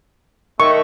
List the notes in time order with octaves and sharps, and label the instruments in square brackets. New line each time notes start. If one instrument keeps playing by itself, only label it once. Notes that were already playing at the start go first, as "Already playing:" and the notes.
[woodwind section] D#3 A3 [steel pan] C#6